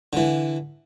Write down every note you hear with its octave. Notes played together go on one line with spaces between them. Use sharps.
D3 E3